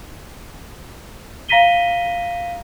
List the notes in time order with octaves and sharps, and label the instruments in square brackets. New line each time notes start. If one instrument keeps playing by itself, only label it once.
[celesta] F5 A#5 A#6 B6 D#7 G7